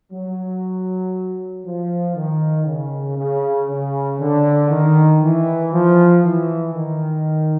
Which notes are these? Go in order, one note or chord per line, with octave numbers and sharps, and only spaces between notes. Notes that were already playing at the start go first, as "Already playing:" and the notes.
F#3
F3
D#3
C#3
C#3
C#3
D3
D#3
E3
F3
E3
D#3